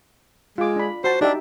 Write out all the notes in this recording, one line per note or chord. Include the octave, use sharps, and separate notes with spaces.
G#3 F4 D6
D4 B5
F#4 C5 A5
D4 D#4 G4 E5